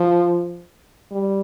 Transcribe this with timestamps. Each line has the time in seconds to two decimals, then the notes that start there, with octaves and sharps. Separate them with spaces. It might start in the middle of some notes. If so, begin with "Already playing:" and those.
Already playing: F3
1.11 G3